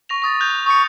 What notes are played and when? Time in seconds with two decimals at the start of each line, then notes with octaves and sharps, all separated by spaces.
0.09 C#6 A#6 F7
0.22 C#6 D#6 A6
0.40 F#6 G6 F7
0.66 C#6 D#6 C#7